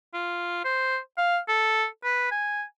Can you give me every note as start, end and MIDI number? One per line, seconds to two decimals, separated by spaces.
0.14 0.63 65
0.65 0.98 72
1.18 1.38 77
1.48 1.86 69
2.04 2.30 71
2.31 2.63 80